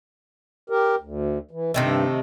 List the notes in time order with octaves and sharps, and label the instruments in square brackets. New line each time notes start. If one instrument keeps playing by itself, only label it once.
[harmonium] G4 A#4
D2
E3
[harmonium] G2 [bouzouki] C3 D#3 A3